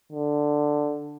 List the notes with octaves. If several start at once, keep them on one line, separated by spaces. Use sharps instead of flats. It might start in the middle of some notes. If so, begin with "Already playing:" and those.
D3